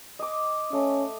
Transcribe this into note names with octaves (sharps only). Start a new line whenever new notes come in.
D#5 D6
A3 C#4